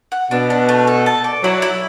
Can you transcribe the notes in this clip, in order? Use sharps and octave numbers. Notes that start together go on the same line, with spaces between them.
F#5
B2 D4
D4
A3
A4
A5
D5
F#3 E4
E4